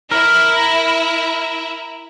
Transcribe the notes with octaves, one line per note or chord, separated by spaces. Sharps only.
E4 A#4 E5